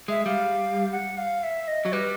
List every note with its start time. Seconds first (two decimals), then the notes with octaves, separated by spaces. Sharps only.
0.08 G#3 E5
0.26 G3 F5
0.92 F#5
1.18 F5
1.43 E5
1.68 D#5
1.85 F#3
1.93 G3 B4